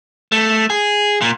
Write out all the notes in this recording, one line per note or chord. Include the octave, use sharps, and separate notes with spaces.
A3
G#4
A#2